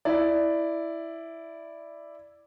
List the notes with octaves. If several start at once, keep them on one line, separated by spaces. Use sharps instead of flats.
E4 D5